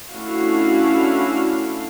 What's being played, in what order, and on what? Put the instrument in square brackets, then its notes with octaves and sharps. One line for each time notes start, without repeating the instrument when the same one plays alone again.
[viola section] A3 C#4 D4 E4 F#4 F5